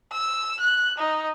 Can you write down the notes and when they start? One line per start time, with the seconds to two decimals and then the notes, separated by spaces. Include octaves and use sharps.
0.12 E6
0.60 F#6
0.98 D#4